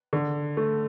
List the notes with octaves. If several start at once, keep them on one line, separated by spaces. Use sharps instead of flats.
D3
A3